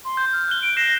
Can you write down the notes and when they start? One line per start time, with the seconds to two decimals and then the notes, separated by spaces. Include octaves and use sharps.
0.05 C6
0.17 G6
0.33 F6
0.48 F#6 G7
0.62 D7
0.77 F#6 A#6 C7 E7